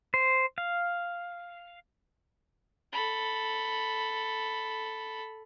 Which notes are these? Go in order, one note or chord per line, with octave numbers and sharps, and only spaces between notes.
C5
F5
A4 B5